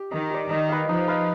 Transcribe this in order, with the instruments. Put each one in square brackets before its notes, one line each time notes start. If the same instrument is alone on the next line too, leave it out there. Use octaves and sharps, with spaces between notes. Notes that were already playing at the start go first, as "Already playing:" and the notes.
Already playing: [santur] G4
[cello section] D#3 [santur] D#4
[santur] G4 D5
[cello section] D#3 [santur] D#4
[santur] B4 F5
[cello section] F3 [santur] D#4
[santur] B4 F5